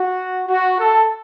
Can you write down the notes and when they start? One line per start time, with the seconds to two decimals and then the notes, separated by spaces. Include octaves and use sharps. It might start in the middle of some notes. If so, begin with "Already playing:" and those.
Already playing: F#4
0.49 F#4
0.78 A4